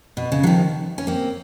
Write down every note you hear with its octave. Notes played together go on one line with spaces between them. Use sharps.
B2
C#3
F#3
D#3 F3
C#4
A#3 C4